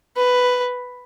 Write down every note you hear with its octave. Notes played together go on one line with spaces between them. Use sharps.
B4